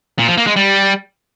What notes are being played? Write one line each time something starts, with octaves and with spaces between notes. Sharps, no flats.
A#2
F3
A#3
G#3
G3